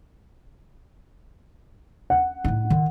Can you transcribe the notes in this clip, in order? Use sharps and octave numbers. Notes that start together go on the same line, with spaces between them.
F#5
A2 D#4
D#3